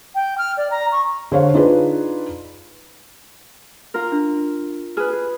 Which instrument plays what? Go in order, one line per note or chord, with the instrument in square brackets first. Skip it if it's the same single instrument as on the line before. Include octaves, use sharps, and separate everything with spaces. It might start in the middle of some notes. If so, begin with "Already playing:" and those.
[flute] G5
F6
D5
A#5
C#6
[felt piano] D3 C5 C#5 F5
D4 D#4 F4 G#4 B4
[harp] F4 A#4
[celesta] D4
[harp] G#4 B4 [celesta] F6
[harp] G#4